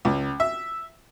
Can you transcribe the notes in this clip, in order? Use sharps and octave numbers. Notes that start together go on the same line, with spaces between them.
C#2
E5